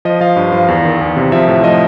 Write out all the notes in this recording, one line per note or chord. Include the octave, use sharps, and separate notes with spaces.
F3 D#5
F3 F5
G2
F3 F5
E2
D#3
E2
C3
F3 E5
A2
F3 D#5